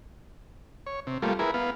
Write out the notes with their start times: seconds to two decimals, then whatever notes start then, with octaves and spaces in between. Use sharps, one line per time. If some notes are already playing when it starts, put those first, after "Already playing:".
0.86 C#5
1.07 C3
1.22 G3 A3 A#3 F4
1.39 E4 G#4 A#4 B4
1.54 B3 F5